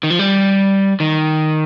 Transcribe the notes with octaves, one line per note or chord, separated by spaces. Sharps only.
D#3
F3
G3
D#3